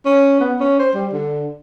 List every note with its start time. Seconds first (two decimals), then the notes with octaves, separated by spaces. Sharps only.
0.06 C#4
0.40 B3
0.61 C#4
0.79 C5
0.94 G3
1.13 D3